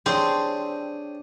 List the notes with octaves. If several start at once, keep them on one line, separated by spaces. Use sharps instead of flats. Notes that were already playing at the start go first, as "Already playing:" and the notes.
C4 D4 G4 G#4 C#5